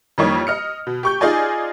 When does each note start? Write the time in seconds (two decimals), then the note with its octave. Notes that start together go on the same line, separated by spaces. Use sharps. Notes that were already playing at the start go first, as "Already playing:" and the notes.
0.18 F2 E3 G3 A#3 D#4 C#5
0.47 D#5 F6 C#7
0.87 B2
1.03 G4 C#6 G6
1.21 D#4 F4 G#4 D5 D#5 G#5